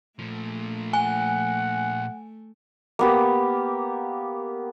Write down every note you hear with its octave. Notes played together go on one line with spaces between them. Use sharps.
A#2 F3 A3
F#5 G#5
A#3 B3 G4